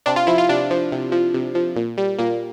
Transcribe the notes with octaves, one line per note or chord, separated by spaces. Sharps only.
C3 D4
F4
F3 E4
F4
C3 D4
F3
C3
F3
C3
F3
A#2
G3
A#2 A#3